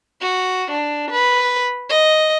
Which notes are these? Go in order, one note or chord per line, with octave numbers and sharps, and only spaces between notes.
F#4
D4
B4
D#5